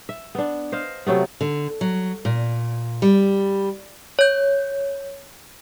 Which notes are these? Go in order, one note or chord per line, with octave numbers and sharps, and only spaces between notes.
E5
B3 D4
C5 D#5 F5
C3 F#3 A3 B3
D3
F#3
A#2
G3
C#5 G6